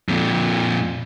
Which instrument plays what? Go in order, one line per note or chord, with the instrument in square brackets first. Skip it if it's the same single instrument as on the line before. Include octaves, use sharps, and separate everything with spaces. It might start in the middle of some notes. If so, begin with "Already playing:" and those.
[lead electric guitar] F2 A#2